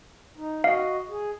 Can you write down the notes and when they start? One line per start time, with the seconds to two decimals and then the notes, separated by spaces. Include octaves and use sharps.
0.37 D#4
0.64 F#4 D#5 F5
1.09 G#4